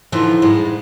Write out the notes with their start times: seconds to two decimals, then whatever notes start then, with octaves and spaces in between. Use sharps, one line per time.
0.12 D3 E3 F3 D#4
0.42 G#2 G3 G#3